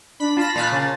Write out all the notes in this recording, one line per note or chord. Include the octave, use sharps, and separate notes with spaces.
D4 B5
F4 A5 B5 A#6
A#2 F5 B5 F#6
C#3